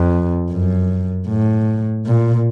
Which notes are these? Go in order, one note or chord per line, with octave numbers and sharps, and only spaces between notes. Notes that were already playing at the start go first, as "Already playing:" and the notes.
Already playing: F2
F#2
A2
A#2